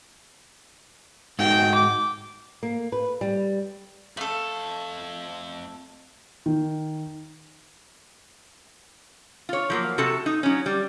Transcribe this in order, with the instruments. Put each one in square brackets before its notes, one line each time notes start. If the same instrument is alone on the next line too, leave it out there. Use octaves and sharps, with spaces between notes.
[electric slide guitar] G#2 D#4 F#4 [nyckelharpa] G5
[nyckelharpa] D6
[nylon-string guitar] A#3
B4
G3
[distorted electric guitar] F2 F5 [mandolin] A3 A4
[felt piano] D#3
[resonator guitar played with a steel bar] F4 C#5
F3 F#3 A#3
C3 F#4 A4 A5
D#4
F#3 C#4
G3